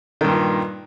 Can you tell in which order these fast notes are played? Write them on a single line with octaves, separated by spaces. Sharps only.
D#3 G2 A#2